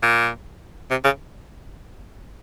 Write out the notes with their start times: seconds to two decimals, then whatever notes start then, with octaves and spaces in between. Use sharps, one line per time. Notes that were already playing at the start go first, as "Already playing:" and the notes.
0.02 A#2
0.90 C3
1.04 C#3